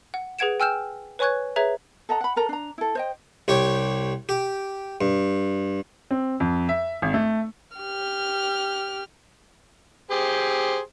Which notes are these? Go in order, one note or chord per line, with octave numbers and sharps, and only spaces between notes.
F#5
G#4 B4 F#5 G#6 D7 E7
G5 G#5 E6 F6 G6 E7
B4 C#5 G#5 C#6 F#6 G#6
G#4 B4 C#5 E5 A#5 G#6
A4 D#5 F#5 A#5
F#5 B5
A4 A#4 A#5
D4 A#5
E4 A4
C5 D#5 G5
C2 G4 C#5
G4
G2
C4
F2
E5
G#1
A3
G4 F6
G4 G#4 C5